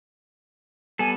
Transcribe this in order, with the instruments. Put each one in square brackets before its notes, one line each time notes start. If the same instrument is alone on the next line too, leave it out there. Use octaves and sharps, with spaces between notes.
[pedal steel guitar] G3 B3 A4 [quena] G#5